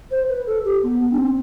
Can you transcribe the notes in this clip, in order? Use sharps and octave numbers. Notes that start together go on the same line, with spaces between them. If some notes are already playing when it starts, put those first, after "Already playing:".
C5
B4
A4
G4
B3
B3
D4
C4